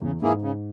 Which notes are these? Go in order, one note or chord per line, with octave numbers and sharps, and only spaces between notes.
E2 C#3
G#2 E3 A#3 E4 G#4
C#3